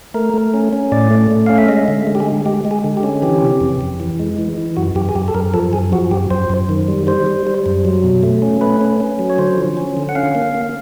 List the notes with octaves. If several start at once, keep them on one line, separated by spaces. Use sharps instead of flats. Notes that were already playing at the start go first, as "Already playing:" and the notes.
A3 A#4
A3
C#4
C#4
A2 D5
A3
A3
C#4 F5
E5
G#3 D#5
D3
G#3
G4
G#4
G#3
G#3 G4
G#3
G#4
D3
G4
C#4
E3 G4
C3
F2
F2
E3
G#3
E3
E3
F#2 F#4
F#2 G4
G#4
F#2 G4
A4
F#2 A#4
F3 A4
F#2 G#4
F3 F#4
F#2 G4
F#2 C5
F#2
D#3
G3
G3 C5
G3
G3
F#2
F#3
B2
A3
C#4
A3 B4
C#4
C#4
F#3
C#5
D3 C5
F3
C#4
D3
F#5
C#4 F5
A#3
A#3